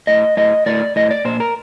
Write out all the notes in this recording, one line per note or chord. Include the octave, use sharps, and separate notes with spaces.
A2 D#5
A2 D#5
A2 D5
A2 D#5
D5
A#2 C5
A#4